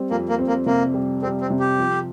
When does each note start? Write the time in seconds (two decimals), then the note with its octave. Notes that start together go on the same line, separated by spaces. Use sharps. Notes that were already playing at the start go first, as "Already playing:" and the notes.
Already playing: G3 C4
0.11 F2 A#3
0.29 A#3
0.39 C4
0.48 A#3
0.66 C3 A#3
0.94 G3
1.22 G3 C4
1.41 C4
1.50 C3
1.60 G4
1.78 F3